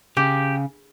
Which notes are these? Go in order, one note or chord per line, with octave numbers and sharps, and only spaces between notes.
C#3 G4